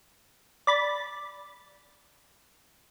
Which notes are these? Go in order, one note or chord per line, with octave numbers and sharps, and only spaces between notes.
D5 B5 A6